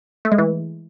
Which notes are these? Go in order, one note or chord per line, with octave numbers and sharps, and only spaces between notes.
A3
G#3
E3